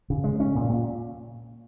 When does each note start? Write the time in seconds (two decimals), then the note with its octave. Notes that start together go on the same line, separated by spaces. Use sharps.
0.10 C#3
0.24 G#3
0.40 C#4
0.55 A#2
0.70 A#2